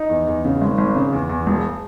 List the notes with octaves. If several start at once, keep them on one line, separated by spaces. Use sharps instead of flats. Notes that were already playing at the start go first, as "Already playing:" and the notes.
Already playing: D#4
E2
E2
C#3
G#1
G#1
C#3
E2
E2
E1